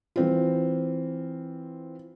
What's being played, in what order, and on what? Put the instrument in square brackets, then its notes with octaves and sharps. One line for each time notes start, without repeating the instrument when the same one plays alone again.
[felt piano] E3 C4 F4